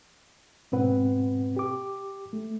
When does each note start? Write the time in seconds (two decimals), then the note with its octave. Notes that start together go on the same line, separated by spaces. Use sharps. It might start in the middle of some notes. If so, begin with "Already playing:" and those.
0.72 G#2 B2 C4 B4 F#5
1.57 G4 D6
2.33 A3